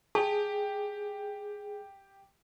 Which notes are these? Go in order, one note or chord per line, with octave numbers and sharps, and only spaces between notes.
G4 G#4 A5